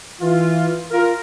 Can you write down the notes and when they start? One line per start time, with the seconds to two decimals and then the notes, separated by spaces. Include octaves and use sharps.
0.21 E3 F4
0.90 F4 A#4